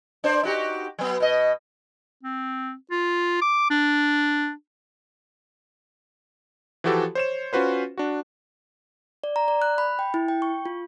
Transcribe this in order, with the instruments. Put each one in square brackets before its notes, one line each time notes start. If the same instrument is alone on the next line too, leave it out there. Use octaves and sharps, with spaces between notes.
[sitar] D4 C5 D5
D#4 F#4 G4
F#3 B3
B2 D#5
[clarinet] C4
F4
D6
D4
[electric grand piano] E3 F3 F#4 G4 A4
C5 C#5 E7
C#4 F4 F#4 B4 C5
D4 F#4
[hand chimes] D5
A#5
D5
F#6
B5
G5
E4
G5
C#6
F4